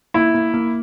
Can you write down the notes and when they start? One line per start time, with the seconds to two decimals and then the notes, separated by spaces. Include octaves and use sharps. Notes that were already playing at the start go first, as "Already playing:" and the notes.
0.14 A#3 E4 E5
0.34 A#3
0.54 A#3